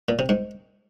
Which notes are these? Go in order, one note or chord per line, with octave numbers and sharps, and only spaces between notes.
A#2
C3
G#2